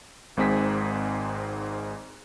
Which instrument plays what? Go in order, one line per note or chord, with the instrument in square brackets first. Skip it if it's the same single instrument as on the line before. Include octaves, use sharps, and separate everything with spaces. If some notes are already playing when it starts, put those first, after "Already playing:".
[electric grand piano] G#1 G#2 C4 G#4 B6